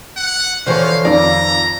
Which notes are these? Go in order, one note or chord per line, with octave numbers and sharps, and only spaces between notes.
F#5
D3 E3 F3 C5 C#5 F5
F2 D#3 D5 A#5